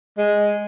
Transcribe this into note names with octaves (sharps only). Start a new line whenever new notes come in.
G#3